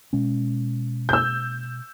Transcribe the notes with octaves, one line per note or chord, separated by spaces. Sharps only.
B2 G#3 C#4
E6 G6